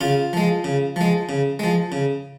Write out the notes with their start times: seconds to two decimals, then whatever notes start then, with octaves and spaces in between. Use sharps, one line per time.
0.01 C#3 F4
0.33 F3 G#3
0.64 C#3
0.96 F3 G#3
1.29 C#3
1.59 F3 G#3
1.92 C#3